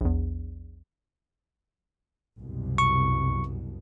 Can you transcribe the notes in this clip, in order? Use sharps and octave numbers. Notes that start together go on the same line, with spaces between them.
A#1 E2
C2 F#2 B2
C#6